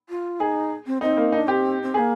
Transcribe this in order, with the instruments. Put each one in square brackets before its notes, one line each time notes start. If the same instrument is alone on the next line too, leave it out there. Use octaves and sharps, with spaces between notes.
[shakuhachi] F4
[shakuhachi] D#4 [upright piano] G#4
[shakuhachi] C4
[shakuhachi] C4 [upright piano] D#4
[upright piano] A#3
[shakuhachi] D4 [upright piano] D#4
[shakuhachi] C4 [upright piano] G4
[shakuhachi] C4
[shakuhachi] A#3 C4 [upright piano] G#4